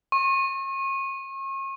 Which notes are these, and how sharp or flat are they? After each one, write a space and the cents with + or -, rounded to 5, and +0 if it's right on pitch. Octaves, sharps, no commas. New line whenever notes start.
C#6 -40